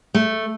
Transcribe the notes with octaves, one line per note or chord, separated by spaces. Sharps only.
A3